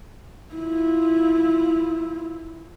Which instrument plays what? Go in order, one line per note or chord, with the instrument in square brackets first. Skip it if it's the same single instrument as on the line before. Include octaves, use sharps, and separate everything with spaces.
[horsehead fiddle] E4 F4